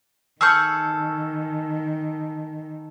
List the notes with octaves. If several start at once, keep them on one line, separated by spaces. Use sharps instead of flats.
D#3 G#4 A4 C#6 E6 F6 G6